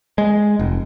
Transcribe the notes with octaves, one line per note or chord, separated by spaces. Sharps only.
G#3
F1